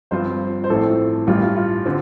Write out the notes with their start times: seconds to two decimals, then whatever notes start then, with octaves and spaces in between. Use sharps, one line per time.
0.11 G1 G2 F3 C4 F4 C5
0.64 C5
0.69 A1 A2 F3 C4 A4
1.27 A1 G2 G3 F4
1.42 F4
1.56 F4
1.86 D3 C4